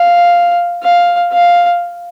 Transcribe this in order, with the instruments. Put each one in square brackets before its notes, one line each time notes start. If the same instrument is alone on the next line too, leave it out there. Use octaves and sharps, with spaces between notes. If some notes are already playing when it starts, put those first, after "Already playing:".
Already playing: [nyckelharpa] F5
F5
F5